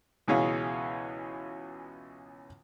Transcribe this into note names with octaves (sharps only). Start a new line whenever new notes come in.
C#2 B2 E3 C#4 G#4 F5